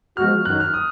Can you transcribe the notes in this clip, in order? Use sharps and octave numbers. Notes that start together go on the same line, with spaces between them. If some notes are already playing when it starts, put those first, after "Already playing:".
F3 G#3 B3 F#4 F6
F#2 D#3 F#3 F#6
F6
D#6